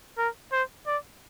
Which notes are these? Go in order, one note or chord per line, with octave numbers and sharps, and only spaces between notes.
A#4
C5
D5